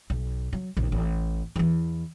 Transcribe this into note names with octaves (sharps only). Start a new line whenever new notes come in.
B1
F#3
A#1 D#2
A1
E2 E3